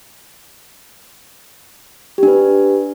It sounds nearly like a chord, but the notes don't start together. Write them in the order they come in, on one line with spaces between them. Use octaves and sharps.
G4 D4 B4